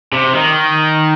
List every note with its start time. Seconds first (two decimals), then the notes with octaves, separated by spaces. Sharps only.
0.13 C3
0.34 D#3